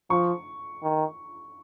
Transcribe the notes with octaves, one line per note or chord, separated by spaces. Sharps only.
F3 C#6
D#3